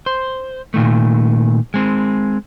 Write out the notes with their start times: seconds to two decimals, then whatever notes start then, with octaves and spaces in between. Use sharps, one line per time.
0.06 C5
0.74 A#2 D#3 A3
1.74 G#3 C4